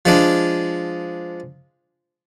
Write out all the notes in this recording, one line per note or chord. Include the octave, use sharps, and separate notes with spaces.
F3 G#3 D4